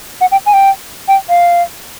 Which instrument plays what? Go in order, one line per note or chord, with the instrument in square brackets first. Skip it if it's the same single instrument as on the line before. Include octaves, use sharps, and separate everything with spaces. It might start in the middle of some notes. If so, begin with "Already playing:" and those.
[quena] F#5
G5
G#5
G5
G5
F5